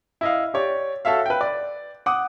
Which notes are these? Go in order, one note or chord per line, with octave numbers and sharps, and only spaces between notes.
E4 D#5 F5
G4 C#5 D5
F#4 A4 C#5 E5 F5
B4 G5
D5
F#5 D6 D#6